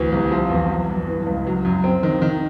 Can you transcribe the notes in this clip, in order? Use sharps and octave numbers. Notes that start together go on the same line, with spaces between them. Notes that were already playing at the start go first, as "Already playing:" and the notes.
Already playing: D2 E3
C2
F3
E2
F#3
G2
E3
C#2
F#3
F#2
C4
D#3
D#3